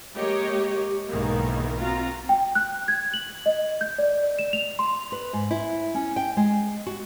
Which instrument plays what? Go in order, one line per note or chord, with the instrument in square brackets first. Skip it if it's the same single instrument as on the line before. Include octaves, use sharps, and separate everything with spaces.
[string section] G#3 A#3 G4 C#5 D#5
B1 G#2 D#3 E3 A#3
C4 F4 F#4 A#5
[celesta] G5
F#6
G#6
F#7
D#5
G6
D5
E7
F7
C6
[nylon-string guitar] B4
G#2
E4
C#4
G5
G#3
F#4